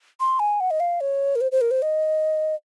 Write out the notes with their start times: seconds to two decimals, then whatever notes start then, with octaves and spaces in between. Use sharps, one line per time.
0.20 C6
0.40 G#5
0.60 F#5
0.71 D#5
0.80 F5
1.01 C#5
1.36 A#4
1.41 C5
1.52 C5
1.61 A#4
1.71 C5
1.82 D#5